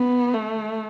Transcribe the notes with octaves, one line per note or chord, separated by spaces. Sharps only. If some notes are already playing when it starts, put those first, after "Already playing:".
Already playing: B3
A3